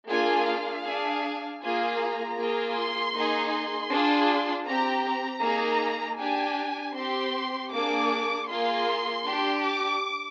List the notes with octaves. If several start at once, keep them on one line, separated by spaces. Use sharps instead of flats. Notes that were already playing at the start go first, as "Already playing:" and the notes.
A#3 D4 F4 G#4 G#5
F5
D4 G#4
A#3 F4 G#4 G#5
A#5
A#3 F4 G#4
C6
A#3 D#4 G#4
C6
D4 F4 G#4
C4 G4 A#5
A#5
A#3 D#4 G#4
D4 G4 G#5
C4 G4 C6
A#3 D4 G#4 D6
A#3 F4 G#4 C6
D4 G4
D6